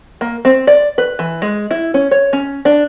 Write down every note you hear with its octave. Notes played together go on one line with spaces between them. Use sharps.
A#3
C4
D5
B4
E3
G#3
E4
C#4
C#5
C#4
D4